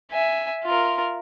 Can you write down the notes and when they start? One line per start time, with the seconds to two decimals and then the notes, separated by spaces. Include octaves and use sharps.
0.12 E5 G#5
0.65 F4 A#4